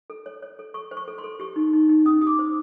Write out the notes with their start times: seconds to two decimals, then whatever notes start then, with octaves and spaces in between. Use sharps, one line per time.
0.10 A4
0.26 C#5
0.43 C#5
0.59 A4
0.74 A4 C#6
0.91 C5
0.97 C#6
1.08 A4
1.18 C6
1.24 A4
1.40 G4 C#6
1.56 D#4
1.73 D#4
1.89 D#4
2.05 C#4 D#6
2.21 G4 D#6
2.27 D6
2.39 C5